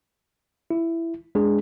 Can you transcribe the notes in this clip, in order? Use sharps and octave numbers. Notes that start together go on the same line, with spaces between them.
E4
G#3 D4 G#4